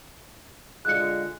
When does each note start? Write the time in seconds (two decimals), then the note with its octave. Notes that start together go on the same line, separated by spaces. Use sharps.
0.85 D3 G#3 F4 F#6 C#7